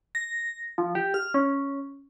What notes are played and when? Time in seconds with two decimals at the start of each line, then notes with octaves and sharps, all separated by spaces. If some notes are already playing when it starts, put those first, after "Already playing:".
0.15 A#6
0.78 F3
0.95 G4
1.14 F6
1.34 C#4